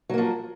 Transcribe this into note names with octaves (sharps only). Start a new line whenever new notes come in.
F3 F#3 A#3